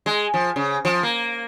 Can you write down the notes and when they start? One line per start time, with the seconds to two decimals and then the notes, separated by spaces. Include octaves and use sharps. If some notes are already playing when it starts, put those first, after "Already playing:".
0.06 G#3
0.34 F3
0.56 C#3
0.85 F3
1.03 A#3